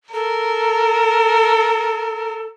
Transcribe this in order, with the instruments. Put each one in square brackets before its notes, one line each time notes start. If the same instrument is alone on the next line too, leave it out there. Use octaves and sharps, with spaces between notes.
[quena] A4 [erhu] A#4